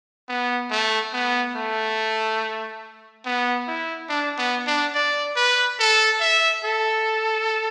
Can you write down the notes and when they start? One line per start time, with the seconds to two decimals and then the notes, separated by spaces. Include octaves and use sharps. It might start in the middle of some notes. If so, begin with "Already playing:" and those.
0.29 B3
0.71 A3
1.13 B3
1.56 A3
3.26 B3
3.68 E4
4.09 D4
4.38 B3
4.67 D4
4.95 D5
5.37 B4
5.80 A4
6.21 E5
6.65 A4